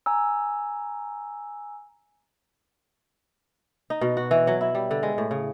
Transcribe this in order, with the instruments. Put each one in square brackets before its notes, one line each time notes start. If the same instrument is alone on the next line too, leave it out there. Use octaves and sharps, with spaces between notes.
[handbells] G#5 A#5 E6
[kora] D#4
B2
F#4
E3
F#3
E4
G3
D3
G#3
A2
C#3